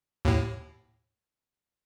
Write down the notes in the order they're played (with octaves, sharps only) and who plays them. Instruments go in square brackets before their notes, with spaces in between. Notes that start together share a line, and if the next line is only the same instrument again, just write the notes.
[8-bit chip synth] D#2 A2